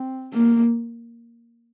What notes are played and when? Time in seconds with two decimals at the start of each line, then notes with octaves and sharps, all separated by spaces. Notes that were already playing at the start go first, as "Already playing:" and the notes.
Already playing: C4
0.33 A#3